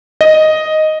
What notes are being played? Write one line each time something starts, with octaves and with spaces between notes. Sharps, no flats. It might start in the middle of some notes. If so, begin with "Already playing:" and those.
D#5